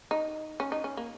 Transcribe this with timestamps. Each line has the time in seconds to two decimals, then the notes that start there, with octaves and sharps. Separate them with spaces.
0.11 D#4
0.60 C#4
0.72 D#4
0.84 C#4
0.97 A#3